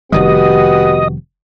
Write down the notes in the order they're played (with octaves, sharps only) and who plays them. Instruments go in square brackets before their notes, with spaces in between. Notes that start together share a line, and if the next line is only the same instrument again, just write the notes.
[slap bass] F1 D#3 G3 [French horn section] B3 F#4 G4 [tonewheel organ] D#5